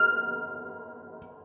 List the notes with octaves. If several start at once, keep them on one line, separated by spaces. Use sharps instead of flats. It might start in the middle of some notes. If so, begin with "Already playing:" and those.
Already playing: F6